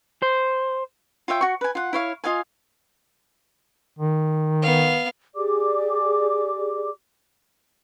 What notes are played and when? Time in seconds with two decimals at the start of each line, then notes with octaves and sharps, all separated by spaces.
0.22 C5
1.28 F4 C#5 E5 G5
1.41 F#4 C#6
1.61 B4 G#5
1.75 F4 F#5
1.93 E4 C#5 F5
2.24 F4 D#5 F5 G#5
3.99 D#3
4.62 B3 F5
5.35 G4 G#4 D5 D6